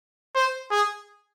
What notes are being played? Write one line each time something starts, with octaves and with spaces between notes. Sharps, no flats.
C5
G#4